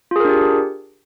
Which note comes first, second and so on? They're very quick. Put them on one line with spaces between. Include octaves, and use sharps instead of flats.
F4 G#4 A#4 D4 G4